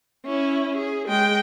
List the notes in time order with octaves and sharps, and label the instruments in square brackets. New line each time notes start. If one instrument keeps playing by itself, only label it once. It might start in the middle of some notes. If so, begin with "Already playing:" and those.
[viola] C#4 E4
G#4
G#3 G5